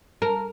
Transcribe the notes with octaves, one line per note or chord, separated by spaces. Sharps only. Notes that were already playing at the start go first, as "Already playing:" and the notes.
A#4